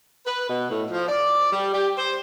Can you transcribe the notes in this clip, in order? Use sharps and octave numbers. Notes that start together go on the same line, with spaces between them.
B4
B2
A2
F3
D5
G3
G4
C5